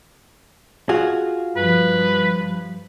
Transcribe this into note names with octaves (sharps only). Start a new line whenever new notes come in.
F4 F#4 G#4
G2 F3 B4